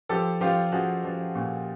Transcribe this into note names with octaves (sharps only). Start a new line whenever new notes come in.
F3 G4 A4
F3 F4 G4
F3 F#4 G#4
F3
A#2